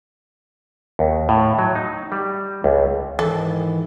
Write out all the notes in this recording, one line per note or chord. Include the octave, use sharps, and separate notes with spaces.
D#2
A2
F#3
D#4
G3
C#2
G#2 D#3 E3 A4